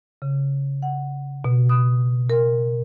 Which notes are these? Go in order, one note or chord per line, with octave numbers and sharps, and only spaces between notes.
C#3
F#5
B2
D#6
A#4